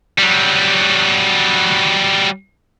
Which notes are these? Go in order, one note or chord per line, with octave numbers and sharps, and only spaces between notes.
F#3 G3